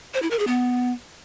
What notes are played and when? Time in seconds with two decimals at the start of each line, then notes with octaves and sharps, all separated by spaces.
0.14 C5
0.22 E4
0.31 A#4
0.39 G#4
0.47 B3